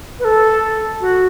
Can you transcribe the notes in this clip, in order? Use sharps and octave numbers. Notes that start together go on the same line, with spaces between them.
B4
A4
F#4